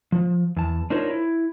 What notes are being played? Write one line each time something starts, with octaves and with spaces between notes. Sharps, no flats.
F3
E2 A5
D4 D#4 F4 A#4 C5 C#5
E4